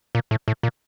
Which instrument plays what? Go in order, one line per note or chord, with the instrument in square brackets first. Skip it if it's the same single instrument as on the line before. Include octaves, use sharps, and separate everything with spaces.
[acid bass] A#2
A2
A2
A#2